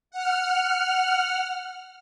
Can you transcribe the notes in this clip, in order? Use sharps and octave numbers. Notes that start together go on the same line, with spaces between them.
F#5 F6